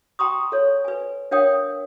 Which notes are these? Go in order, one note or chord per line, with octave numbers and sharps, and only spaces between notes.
G5 A#5 C6 C#6 D#6
A4 C#5
B4 G#5
D4 A#4 C#5 F5 G5 D#6